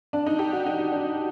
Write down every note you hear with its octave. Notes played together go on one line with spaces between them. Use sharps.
D4
D#4
G4
F#4
D#4
D4